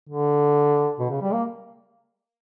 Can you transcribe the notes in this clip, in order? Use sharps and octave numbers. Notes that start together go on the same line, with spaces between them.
D3
B2
C#3
G3
A#3